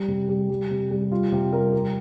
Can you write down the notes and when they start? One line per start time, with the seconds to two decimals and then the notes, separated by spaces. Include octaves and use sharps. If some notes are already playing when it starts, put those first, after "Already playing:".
Already playing: G3
0.08 C3
0.29 G3
0.50 G3
0.71 C3
0.91 G3
1.11 G3 F4
1.32 C3 G4
1.53 G3 A#4
1.72 G3 G4